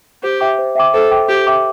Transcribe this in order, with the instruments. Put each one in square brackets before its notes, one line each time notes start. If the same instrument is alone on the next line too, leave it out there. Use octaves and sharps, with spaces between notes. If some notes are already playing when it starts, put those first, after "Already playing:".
[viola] G4 [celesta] C5
[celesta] E5 G5 D6
C5
E5 G5 D6
[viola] A4 [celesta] C5
[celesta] E5 G5 D6
[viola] G4 [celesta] C5
[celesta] E5 G5 D6